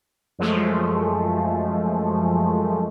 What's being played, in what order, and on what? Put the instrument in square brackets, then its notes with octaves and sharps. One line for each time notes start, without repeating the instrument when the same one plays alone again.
[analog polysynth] F#2 F3 G#3 A3